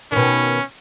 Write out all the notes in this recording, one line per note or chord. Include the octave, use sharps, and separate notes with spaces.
B2 D#3 C#4